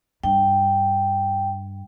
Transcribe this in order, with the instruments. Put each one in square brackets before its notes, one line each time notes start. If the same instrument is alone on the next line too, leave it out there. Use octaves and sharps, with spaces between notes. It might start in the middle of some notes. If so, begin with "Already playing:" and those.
[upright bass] G2 [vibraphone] G5